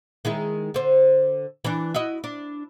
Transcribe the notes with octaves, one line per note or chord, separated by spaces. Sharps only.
D#3 G#3 E4
D3 C5
E3 D4
E4 F#4 D#5
D4